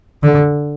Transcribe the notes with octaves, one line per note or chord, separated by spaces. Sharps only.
D3